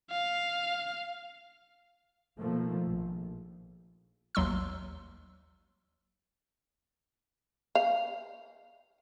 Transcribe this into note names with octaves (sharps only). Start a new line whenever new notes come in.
F5
B2 D#3 F3 A3 A#3
A#1
A1 D#2 F#3 C6 E6
F5